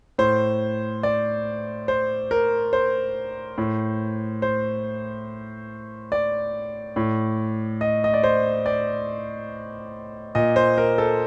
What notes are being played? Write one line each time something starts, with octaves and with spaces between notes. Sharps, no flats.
A2 C5
D5
C5
A#4
C5
A2
C5
D5
A2
D#5
D#5
D5
C5
D5
A#2 D#5
C5
A#4
A4